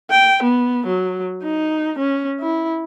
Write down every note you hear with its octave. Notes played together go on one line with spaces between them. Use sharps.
G5
B3
F#3
D#4
C#4
E4